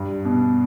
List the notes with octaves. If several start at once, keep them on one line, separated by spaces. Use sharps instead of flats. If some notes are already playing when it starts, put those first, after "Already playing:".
Already playing: G2
B2